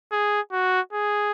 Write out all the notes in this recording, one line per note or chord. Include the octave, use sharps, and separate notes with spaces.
G#4
F#4
G#4